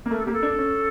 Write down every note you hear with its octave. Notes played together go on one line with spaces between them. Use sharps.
A#3
A3 A#4
A4
A#3 G4
A4
D4
C#4